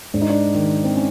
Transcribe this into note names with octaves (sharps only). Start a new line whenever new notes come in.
G#2 D4
D#4
D4
D#3
C4
C#4